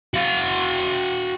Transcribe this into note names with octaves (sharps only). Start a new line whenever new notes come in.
F#4 F5